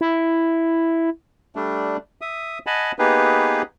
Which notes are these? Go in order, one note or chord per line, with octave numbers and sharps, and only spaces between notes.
E4
G3 A3 D4
E5 D#6
D#5 F#5 G#5 A5 B5
A#3 B3 D#4 G4 G#4 B4